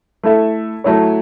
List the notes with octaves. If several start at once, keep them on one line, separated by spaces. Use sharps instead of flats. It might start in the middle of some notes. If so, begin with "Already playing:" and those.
A3 E4 A4 E5
F#3 A3 E4 C#5